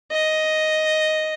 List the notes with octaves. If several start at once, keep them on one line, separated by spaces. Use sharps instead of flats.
D#5